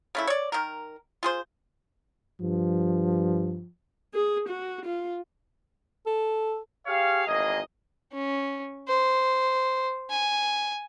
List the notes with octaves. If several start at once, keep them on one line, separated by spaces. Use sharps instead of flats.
C#3 A3 E4
C#5 D5
D#3 A#4
F4 G#4 C5
G2 F3
G#4
F#4
F4
A4
G4 G#4 C#5 F5
G#1 E2 A#3 G#4 D#5
C#4
C5
G#5